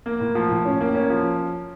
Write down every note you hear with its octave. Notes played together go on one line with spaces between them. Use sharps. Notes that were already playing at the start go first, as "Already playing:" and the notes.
A#3
A2
F3
A2
C#4
A#3
C#4
F3